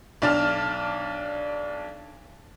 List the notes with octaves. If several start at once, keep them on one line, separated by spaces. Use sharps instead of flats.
B1 D4 D5 A5 F6